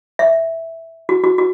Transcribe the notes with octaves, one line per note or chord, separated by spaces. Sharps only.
E5
F#4
F#4
F#4